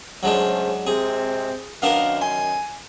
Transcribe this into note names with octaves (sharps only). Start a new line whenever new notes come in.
C#3 F#3 G#3 A3 D4 C5
C3 G#3 C4 G#4
F#2 D#3 B3 D4 A#4 F5
G#5 C6